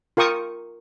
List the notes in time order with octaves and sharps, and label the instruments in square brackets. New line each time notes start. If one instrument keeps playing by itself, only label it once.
[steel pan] F4 A#4 G5 C#6 D#6